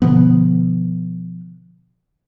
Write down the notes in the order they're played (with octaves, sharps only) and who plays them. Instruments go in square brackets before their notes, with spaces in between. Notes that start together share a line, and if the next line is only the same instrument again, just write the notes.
[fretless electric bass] B2 D3 F3 B3